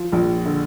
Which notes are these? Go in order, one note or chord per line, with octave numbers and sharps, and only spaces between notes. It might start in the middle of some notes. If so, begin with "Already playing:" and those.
Already playing: F3
A#1
D3